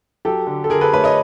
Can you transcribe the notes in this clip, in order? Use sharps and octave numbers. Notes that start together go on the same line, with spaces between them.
F#3 G4 A4
D3
A4
D3 G#4 A#4
A4 B4
A3 B4 C#5
C#5 D#5